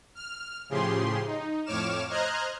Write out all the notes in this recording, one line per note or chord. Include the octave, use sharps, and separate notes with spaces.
F6
A2 C#3 F3 G4 G#4 C6
D#4
F2 A2 C#5 D6 F6 E7
C5 D#5 A#5 F6 F#6 G#6